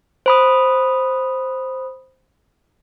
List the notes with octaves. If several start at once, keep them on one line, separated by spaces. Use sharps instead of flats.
C5 B5 D#6